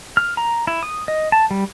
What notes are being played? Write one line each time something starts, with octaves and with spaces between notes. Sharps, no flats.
F6
A#5
E4
D#6
D#5
A5
G3